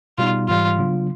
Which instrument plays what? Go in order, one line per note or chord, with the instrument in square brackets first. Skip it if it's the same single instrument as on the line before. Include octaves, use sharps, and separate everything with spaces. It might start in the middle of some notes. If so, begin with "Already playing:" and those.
[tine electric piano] B2 G3 B3 D#4 [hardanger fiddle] F4
[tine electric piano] G#2 E3 G3 [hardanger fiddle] F4
[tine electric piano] C#3 F#3 B3 D4 F4